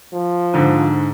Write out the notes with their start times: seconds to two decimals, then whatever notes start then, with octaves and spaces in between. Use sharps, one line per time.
0.13 F3
0.54 G#2 D3